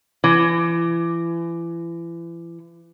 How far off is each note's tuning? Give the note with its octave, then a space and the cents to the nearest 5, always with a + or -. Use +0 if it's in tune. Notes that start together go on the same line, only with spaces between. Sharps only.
E3 +35